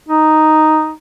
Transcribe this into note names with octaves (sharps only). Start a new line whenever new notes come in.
D#4